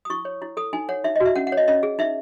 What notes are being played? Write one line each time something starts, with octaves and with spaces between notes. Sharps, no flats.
D#6
E4 C#6
C#5
E4
A4 D#6
D#4 G#5
C#5 F#5
D#4 E5
D#5
F#4
E5
C#4 F#5
F#5
C#5
D#5
C#4 D#5
G#4
D#4 E5